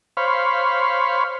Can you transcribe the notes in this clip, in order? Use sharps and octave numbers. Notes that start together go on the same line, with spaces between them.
C5 C#5 F5 B5